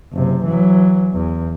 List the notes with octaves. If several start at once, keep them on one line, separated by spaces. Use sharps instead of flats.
F#1 C3
E3 F#3
E2